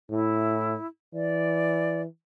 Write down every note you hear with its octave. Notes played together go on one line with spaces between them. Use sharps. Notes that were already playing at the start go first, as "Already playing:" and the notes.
A2 E4
E3 D5